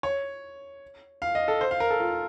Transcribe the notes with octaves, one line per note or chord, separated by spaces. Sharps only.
C#5
F5
D#5
A4
C5
F5
A#4
A4
F4